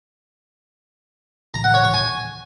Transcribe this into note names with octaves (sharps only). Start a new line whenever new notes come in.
A#5
F#5
C#5
C#6
G#5